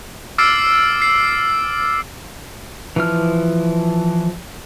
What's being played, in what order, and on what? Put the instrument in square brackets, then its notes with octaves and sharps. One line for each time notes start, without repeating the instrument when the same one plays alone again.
[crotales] D6 E6 F6 A6 C7 D7
C7
[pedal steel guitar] E3 F3 F6